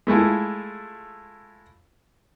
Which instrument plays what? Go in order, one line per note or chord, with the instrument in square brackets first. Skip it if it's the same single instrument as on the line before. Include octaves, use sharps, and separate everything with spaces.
[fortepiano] G#3 A3 E4 F4